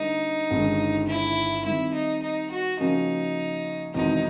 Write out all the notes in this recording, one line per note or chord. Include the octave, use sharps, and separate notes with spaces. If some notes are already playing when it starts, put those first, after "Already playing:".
Already playing: D3 G3 A#3 D#4
G1 G2 D#3 G#3 C#4
E4
D#3 G3 C4 E4
D#4
D#4
F#4
C#3 F3 A#3 C#4 D#4 F#4
E1 E2 C3 D#3 D#4